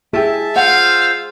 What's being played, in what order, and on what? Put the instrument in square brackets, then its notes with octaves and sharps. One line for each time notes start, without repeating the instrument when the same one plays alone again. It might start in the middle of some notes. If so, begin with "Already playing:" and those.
[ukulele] E4 G4 [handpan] G#4 [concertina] E5 A5
[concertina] F4 C5 E6 [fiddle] F5 [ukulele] F#5